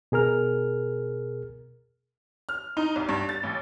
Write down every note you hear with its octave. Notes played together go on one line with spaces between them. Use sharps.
B2 G#4 A#4 F6
F6
D#4
C2
G2
A6
A1